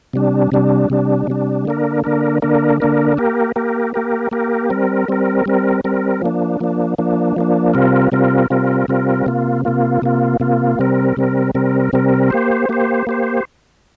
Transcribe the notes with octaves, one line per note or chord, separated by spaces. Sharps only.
C3 G3 D4
C3 G3 D4
C3 G3 D4
C3 G3 D4
D3 A#3 D4 A#4
D3 A#3 D4 A#4
D3 A#3 D4 A#4
D3 A#3 D4 A#4
A#3 G4 A#4
A#3 G4 A#4
A#3 G4 A#4
A#3 G4 A#4
G3 C4 A#4
G3 C4 A#4
G3 C4 A#4
G3 C4 A#4
F3 A#3 D4
F3 A#3 D4
F3 A#3 D4
F3 A#3 D4
C3 G3 C4 F4 A#4
C3 G3 C4 F4 A#4
C3 G3 C4 F4 A#4
C3 G3 C4 F4 A#4
C3 A#3 F4
C3 A#3 F4
C3 A#3 F4
C3 A#3 F4
C3 G3 C4 A#4
C3 G3 C4 A#4
C3 G3 C4 A#4
C3 G3 C4 A#4
A#3 G4 C5
A#3 G4 C5
A#3 G4 C5